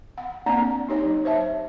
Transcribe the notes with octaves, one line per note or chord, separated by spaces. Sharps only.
F#5
A#3 C4 D4 D5 F#5 A#5
D#4 G4 C#5
F#3
C5 C#5 E5 A5